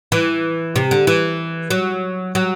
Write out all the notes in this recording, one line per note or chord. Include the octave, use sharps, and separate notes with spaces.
E3
C3
D3
E3
F#3
F#3